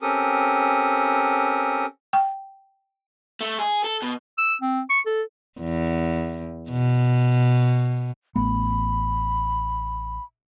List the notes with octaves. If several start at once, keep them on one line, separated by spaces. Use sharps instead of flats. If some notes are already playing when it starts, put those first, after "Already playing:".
C4 C#4 G4 A4 A#4 D#6
G5
A3
G#4
A4
B2
E6
C4
C#6
A4
E2
B2
A1 A3 B3 B5